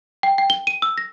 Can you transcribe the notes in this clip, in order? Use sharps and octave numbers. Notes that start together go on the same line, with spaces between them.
G5
G5
G7
D#7
E6
A#6